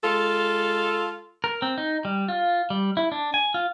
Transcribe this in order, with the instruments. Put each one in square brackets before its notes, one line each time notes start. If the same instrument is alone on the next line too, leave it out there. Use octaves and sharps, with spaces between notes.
[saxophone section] G#3 F4 A4
[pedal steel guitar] A#4
C4
D#4
G3
F4
G3
E4
D4
G#5
F4